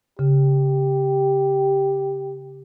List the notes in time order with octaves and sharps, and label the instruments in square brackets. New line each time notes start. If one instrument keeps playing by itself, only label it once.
[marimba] C#3 [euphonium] G4